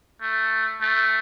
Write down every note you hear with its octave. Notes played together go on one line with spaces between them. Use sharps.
A3
A3